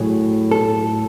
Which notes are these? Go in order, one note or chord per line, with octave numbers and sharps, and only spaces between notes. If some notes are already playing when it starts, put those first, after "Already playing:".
Already playing: A2 F#3 G#4
A4